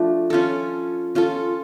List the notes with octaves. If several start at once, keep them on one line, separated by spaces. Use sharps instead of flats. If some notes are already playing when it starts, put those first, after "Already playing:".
Already playing: F3 A3 D4
C#4 F4 A4
C#4 F4 A4